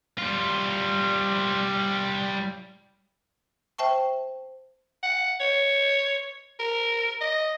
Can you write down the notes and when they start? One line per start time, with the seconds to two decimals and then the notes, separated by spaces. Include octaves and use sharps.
0.18 G3 F4
3.78 C5 E5 G5 A5 C#6
5.03 F#5
5.40 C#5
6.59 A#4
7.21 D#5